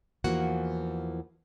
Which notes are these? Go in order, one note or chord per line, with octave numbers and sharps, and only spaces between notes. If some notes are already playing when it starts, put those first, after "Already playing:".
E2 E3 F3 A#3 F#4 F#5